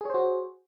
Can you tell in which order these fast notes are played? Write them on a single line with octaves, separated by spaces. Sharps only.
G#4 C#5 C5 F#4